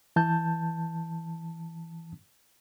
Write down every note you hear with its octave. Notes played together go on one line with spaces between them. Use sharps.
E3 A5 G6